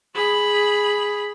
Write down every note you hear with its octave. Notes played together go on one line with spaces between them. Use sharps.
G#4 B5